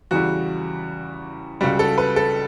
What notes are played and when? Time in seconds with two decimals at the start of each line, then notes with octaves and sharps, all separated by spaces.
0.11 E2 C#3 E3 G3 F#4
1.61 C#2 C#3 G3 F#4
1.79 A4
1.98 B4
2.16 A4